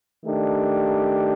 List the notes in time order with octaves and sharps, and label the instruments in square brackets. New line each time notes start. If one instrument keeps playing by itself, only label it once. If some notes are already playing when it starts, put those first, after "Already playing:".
[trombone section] D#3 A3 D4 G4